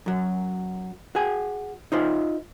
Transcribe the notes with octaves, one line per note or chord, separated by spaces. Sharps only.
F#2 F#3
F#4 G#4 G#5
D#4 F4 C5